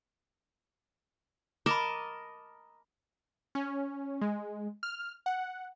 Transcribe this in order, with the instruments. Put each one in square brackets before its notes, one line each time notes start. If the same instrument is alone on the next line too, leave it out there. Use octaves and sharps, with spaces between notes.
[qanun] A#4 D#5 A5 [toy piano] B5 D6
[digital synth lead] C#4
G#3
F6
F#5